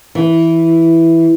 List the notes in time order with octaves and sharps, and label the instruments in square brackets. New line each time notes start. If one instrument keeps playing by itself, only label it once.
[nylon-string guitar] E3